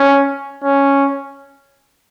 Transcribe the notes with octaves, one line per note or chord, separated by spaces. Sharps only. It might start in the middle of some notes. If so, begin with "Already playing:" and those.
Already playing: C#4
C#4